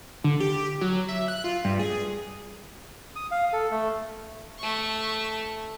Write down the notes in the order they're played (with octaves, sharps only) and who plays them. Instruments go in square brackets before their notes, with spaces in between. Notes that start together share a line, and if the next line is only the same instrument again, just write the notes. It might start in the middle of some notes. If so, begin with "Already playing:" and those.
[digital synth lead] D3
G4
F#3
E5
F#6
F4
G2
G#4
[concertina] D#6
F5
A4
A3
[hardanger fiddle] A3 C#6